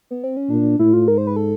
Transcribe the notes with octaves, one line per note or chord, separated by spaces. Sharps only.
B3
C4
C#4
A#2 D4
A2 E4
F4
G#2 A#4
C5
B4
A4